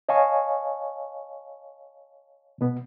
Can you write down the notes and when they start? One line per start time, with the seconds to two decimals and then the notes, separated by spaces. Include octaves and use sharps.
0.09 C#5 D#5 F5 G#5 A5 C#6
2.61 B2 B3